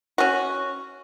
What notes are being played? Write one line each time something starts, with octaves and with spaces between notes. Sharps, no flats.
C#4 F#4